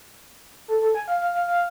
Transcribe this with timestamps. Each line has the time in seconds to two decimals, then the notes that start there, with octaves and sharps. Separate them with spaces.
0.68 A4
0.81 A4
0.95 G#5
1.08 F5
1.21 F5
1.34 F5
1.47 F5